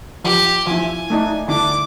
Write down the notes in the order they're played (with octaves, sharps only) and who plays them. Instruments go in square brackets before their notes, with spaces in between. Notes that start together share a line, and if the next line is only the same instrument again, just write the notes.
[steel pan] F3 [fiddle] G4
[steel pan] F3 E4 [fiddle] G#5
[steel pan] A3 D4 D#4
[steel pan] D3 D4 E4 [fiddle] D6